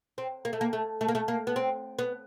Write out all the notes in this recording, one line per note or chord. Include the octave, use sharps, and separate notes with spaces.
C4
A#3
A3
A#3
A3
A3
A#3
A3
A#3
B3
C4
B3